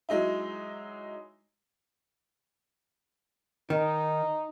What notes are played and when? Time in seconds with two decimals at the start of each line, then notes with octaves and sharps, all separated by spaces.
0.09 F#3 G#3 D#4 E4
3.70 D#3 D#4